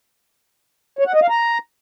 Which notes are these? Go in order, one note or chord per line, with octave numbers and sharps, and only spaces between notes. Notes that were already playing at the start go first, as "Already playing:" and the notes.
C#5
F#5
D#5
F5
A#5